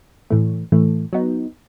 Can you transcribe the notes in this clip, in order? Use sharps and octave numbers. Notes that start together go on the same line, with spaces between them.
A2 E3 A3
A2 E3 A3
F#3 B3 D#4